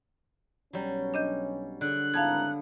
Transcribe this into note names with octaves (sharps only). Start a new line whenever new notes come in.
B1 F#3 G3 C#4
D4 D#5 G6
D3 G#4 F#6
G#1 B3 E4 F5 A5 A#5 G#6